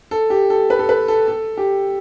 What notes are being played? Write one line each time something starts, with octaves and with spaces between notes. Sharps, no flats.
A4
G4
A4
B4
A4
B4
A4
A4
G4